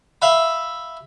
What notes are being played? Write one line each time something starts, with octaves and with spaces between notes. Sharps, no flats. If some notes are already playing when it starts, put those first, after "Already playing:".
E5 F5 B5